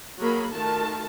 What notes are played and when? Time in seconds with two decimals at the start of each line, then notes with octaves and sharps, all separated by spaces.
0.18 F#3 A#3 F#4 G#4 B5
0.53 D#3 A3 F4 F#4 A#4 A5